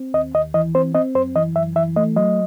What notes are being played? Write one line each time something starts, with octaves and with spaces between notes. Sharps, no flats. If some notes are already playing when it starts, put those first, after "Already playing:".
Already playing: C4
D#2 D#5
D#2 D#5
E3 D#5
C4 C5
C4 D#5
F#2 C5
E3 D#5
F#2 E5
E3 E5
A3 D#5
F#3 D#5